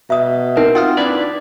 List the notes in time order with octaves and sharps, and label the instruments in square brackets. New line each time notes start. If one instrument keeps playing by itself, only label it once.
[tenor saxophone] B2 [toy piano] E5 D#6
[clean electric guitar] C4 [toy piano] D#4 [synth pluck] A#4
[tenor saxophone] F4 [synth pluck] F#5 D#6 F6
[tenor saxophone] D4 [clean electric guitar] E4 B4 D5